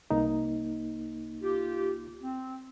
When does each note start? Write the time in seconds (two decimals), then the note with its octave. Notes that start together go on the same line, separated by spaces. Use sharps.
0.11 C2 A#3 D#4
1.42 F4 G4
2.22 C4